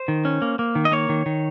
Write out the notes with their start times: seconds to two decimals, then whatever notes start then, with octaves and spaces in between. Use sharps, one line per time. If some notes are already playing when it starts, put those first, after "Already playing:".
Already playing: C5
0.08 D#3
0.25 C#4
0.42 A#3
0.59 A#3
0.75 D#3
0.85 D#5
0.92 A#3 C#5
1.09 D#3
1.26 D#3